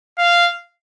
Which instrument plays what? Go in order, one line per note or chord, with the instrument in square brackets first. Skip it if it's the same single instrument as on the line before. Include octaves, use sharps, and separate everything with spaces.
[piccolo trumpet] F5